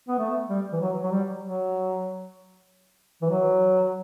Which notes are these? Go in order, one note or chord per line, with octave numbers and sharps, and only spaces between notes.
B3
A3
G3
E3
F#3
F#3
G3
F#3
E3
F#3